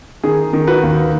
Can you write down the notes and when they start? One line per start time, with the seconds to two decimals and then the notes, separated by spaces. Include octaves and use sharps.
0.23 D#3 G#4
0.53 D#3
0.67 F#4 B4
0.83 D#2